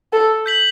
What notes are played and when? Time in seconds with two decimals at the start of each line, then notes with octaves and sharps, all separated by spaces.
0.13 A4
0.46 G6 B6 F#7